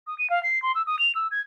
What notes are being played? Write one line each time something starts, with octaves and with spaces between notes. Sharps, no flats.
D#6
D#7
F5
C7
C6
E6
D#6
F7
E6
G#6